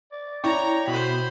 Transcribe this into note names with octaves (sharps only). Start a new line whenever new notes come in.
D5
E4 C#5 D5 G5 A#5 C#6
B2 B3 C5 B5